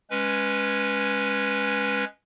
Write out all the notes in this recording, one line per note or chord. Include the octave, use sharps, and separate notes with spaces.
G#3 C#4 B4